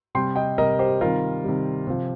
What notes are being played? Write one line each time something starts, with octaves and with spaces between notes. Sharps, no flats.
C3 G3 G5 C6
D#5 G5
C3 G3 A#4 D#5
G4 C5
C3 D#3 G3 F4 A#4
C3 D#3 G3
C3 F3